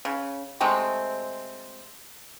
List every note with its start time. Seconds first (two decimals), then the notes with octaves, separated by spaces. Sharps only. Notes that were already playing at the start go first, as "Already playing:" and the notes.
0.05 C#3
0.60 C3 G#3 A3 C4